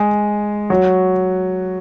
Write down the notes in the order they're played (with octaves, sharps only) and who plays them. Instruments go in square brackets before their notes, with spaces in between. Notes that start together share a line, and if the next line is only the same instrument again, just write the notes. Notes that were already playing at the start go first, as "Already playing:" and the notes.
Already playing: [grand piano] G#3 G#4
F#3 F#4